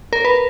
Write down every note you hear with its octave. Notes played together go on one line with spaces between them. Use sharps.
A#4
B4